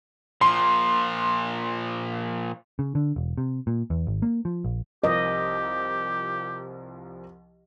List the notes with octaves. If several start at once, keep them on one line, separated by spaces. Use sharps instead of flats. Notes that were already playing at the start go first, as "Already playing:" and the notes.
A#2 F3 C6
C#3
D3
E1
C3
A#2
E2
G#1
A#3
F3
A#1
C2 F3 G4 A#4 D#5